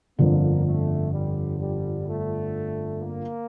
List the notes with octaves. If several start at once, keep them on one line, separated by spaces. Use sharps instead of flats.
G1 F2 D3 A#3
A3
G3
G3
A3
A#3